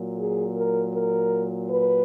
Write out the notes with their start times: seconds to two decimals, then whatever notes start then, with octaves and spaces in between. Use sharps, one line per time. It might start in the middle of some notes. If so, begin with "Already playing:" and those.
Already playing: A#2 F#3
0.19 G#4
0.56 A#4
0.94 A#4
1.69 B4